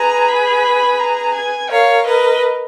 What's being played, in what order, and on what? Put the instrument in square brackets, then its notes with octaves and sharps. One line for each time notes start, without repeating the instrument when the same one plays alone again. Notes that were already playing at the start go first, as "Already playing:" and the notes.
Already playing: [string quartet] G#4 B4 [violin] A#5
[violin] B5
A#5
G#5
[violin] A#4 [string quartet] C#5 F5
[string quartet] B4 D#5